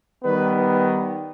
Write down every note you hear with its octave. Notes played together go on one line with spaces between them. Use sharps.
D#3 G3 B3 B4